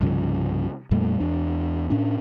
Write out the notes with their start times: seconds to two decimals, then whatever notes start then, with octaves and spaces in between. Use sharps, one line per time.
0.01 C2 G2 C#3 F3
0.91 F2 A#2 G3 A3
1.20 E2 D4
1.90 A2 C#4 D4